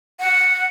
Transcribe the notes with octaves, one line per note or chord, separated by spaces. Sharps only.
F#5